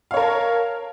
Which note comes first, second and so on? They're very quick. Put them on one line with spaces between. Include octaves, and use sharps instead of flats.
F5 C#5 A#4 A5